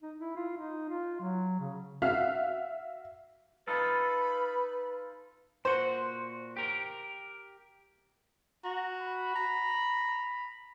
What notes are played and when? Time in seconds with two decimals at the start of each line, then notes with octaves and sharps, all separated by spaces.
0.02 D#4
0.18 E4
0.36 F4
0.57 D#4
0.89 F4
1.21 F#3
1.59 C#3
2.02 F#4 E5 F5 F6
3.68 D#4 F4 A4 B4 B5
5.65 A#2 F#4 C5
6.57 G4 A#4
8.64 F#4 A#5
9.01 B5
9.35 A#5